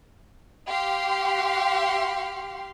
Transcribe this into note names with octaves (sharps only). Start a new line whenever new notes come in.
G4 F5 C6